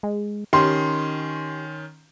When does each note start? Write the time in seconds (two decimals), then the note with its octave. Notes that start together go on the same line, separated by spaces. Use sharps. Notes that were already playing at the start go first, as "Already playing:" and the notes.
0.03 G#3
0.53 D#3 C#4 G4 C6